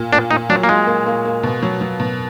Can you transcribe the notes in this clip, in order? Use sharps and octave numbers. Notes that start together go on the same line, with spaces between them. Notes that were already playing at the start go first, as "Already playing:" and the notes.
Already playing: A#2
A#2 D4
A#2 D#4
F#3 D4
A#3
G#3 F4
A#3
A#3
A#3
B2
F#3
F#3
B2